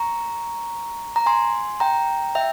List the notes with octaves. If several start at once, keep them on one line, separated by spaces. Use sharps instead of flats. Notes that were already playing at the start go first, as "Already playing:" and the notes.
Already playing: A#5 C#6
A#5
G#5 C6
G5 A#5
E5 G5